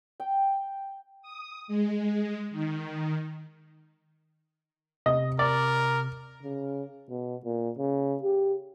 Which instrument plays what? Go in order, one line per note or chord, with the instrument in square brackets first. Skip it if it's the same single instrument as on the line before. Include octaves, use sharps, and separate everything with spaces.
[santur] G5
[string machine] D#6
G#3
D#3
[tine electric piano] C3 [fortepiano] D#5
[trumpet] A#4 [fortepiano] D5
[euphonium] C#3
B2
A#2
C#3
G4